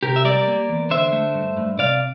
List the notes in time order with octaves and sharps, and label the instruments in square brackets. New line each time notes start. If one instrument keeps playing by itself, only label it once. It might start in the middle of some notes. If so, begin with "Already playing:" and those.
[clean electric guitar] C3 G4 A#4
E5
G3 A#4 D5
A#3
E2
D3 C5 E5
A3
G2
G2
C3 D5 F5